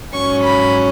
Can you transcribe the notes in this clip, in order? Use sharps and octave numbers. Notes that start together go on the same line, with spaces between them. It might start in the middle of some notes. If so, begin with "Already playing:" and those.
G#2 F#3 C#4 C#6
B5